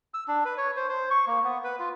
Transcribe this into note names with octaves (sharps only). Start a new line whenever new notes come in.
E6
D4
B4
C#5
C5
C5
C#6
A#3
B3
B4
F4